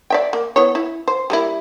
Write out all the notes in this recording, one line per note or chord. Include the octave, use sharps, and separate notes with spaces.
D5 E5 G5
A#3
B3 E4 C#5
E4
C5
G3 A#3 E4